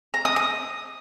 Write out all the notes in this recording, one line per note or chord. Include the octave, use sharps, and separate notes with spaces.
A#5
D#6
D#6